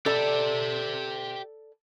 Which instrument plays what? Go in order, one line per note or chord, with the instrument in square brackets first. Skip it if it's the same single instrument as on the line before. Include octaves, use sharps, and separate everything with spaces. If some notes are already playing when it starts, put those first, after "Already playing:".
[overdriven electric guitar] G4 E5 [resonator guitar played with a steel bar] A4 D5